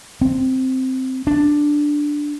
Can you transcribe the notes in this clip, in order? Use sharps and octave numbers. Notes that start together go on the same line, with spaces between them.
C4
D4